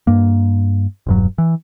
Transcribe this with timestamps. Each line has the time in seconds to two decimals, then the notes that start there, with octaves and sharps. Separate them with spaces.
0.07 G2 A#3
1.07 E1 G2 F#3
1.38 E3